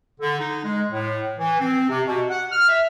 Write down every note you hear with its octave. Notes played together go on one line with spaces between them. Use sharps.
D3
D#4
G#3
A2
E3
C4
C3
B2
F#5
F6
E5